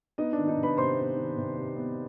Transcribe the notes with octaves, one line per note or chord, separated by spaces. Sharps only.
B3 D#4 D#5
D4 D5
D#3
D#4 D#5
C3
B4 B5
C3 C5 C6
B3
D#3
C3
C3
B3